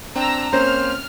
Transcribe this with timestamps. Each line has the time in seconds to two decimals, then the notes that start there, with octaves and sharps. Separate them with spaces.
0.16 C4 D4 G5 A#5 E6
0.53 A#3 C4 C#4 C5 F6